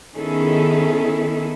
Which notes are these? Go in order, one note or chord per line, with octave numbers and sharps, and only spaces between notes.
D#3 B3 C#4 E4 G#4 A4